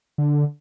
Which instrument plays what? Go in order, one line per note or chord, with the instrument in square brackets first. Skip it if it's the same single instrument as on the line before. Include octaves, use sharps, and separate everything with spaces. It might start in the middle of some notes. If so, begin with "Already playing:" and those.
[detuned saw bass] D3